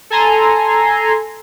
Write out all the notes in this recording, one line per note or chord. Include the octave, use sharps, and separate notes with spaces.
A4 G#5 A#5 C6